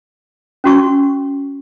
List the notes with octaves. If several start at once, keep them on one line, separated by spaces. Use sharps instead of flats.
C#4 F#4 C#6